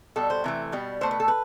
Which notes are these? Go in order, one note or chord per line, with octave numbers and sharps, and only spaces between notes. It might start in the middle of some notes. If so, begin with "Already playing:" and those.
B2 G3 A4
C5
C3 E3 A3
B2 G3
B2 A3 C5
B4
A4
B4